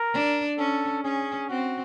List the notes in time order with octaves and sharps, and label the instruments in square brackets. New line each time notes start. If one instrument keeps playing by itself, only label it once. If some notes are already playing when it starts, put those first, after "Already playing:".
Already playing: [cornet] A#4
[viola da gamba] D4
[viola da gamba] C#4 [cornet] A4
[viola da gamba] C#4 [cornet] G#4
[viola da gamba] C4 [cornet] F#4